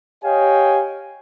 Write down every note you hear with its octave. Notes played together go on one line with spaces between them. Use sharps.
G4 C#5 D#5 F5 G5 G#5